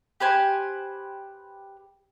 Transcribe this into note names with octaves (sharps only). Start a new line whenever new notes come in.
G4 B4 C5 G#5